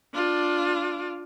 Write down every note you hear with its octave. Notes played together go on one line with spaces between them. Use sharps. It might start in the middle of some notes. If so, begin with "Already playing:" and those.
D4 F4